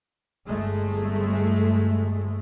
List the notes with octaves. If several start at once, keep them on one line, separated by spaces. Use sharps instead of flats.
G1 G#3 A3